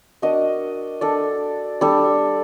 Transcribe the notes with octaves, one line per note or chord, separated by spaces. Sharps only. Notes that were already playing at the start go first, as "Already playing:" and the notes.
D4 F#4 A#4 D#5
D4 A4 D5
G3 D4 A4 D5